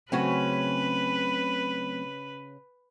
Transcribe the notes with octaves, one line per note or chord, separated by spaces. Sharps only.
C#3 F#3 A3 C4 C#4 F#4 B4